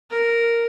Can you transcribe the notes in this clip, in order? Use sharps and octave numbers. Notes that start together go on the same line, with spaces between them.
A#4